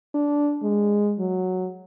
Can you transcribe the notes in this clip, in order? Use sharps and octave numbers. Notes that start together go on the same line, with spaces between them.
D4
G#3
F#3